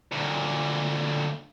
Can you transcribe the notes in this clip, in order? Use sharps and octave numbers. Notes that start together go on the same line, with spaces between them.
D2 A#2